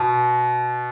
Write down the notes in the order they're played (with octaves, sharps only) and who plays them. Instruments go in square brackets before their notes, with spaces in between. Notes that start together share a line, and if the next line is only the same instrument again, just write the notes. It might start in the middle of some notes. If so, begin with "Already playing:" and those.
Already playing: [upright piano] B2